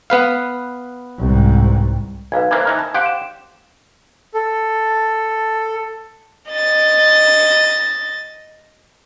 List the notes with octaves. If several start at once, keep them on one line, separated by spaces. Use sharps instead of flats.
B3 B4 F5
C2 G#2
B1 B4 F5 G#6
E3 A#3 C5 G#6
E3 D#4 A#4
A5
G4 C5 F5 F#5 D7
E7
A4
D#5 A6